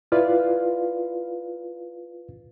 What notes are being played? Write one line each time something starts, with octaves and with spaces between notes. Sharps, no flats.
E4 F4 B4 D5 F5